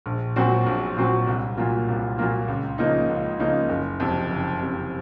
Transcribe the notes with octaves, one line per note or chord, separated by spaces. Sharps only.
A#1
A#2 F#3 C4 F#4
A#1
A#2 F#3 C4 F#4
C2
A#2 F#3 A#3 F4
C2
A#2 F#3 A#3 F4
C#2
C#3 F3 A#3 D#4
C#2
C#3 F3 A#3 D#4
F#1
F2 C3
F#1
F2 C3